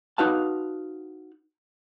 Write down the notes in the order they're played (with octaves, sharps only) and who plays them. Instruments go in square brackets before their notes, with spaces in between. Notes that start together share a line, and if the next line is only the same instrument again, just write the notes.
[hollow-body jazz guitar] D#4 F#4 B4 F5 A5